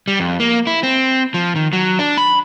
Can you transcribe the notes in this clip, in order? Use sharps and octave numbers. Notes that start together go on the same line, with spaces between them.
G3
F2
A#3
E4
C4
F3
D#3
F#3
D4
B5